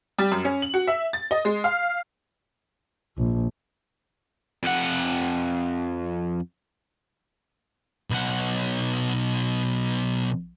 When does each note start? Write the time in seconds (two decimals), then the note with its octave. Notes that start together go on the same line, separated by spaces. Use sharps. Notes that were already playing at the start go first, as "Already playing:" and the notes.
0.18 G3
0.32 F#2
0.45 C#4
0.62 F#7
0.74 F#4
0.87 E5
1.13 A6
1.31 D#5
1.45 G#3
1.64 F5
3.18 A#1
4.63 F2 F#5
8.10 B1 F#5